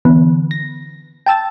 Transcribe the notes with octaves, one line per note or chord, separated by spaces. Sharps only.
D3 E3 B3
A#6
G5 A5 E6 A6